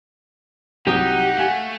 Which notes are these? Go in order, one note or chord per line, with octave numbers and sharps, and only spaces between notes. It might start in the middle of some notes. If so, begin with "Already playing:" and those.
C2 F#3 D#4 G4 F#5 D#6
A3 F5 G#5